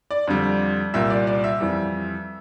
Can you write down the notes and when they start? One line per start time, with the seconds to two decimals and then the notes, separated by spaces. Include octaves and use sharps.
0.11 D5
0.27 F2 D3 G3
0.94 C2 A#2 G3 E5
1.10 D5
1.27 D5
1.44 E5
1.60 F2 E3 G3